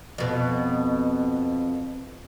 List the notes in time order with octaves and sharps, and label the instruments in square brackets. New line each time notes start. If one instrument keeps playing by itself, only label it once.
[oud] F2 B2